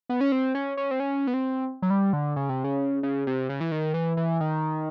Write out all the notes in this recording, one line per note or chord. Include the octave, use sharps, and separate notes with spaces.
B3
C#4
C4
C#4
C#4
C4
C#4
B3
C4
F#3
G3
D3
C#3
C3
C#3
C#3
C3
C#3
E3
D#3
E3
E3
D#3